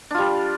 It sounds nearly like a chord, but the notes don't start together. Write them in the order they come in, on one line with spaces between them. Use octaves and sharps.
D4 F4 G3